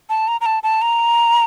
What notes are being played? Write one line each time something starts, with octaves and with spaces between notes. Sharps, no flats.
A5
A#5
A#5
A5
A5
A#5